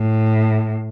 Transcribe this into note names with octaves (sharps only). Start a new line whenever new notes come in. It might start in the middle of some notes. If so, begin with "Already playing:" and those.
Already playing: A2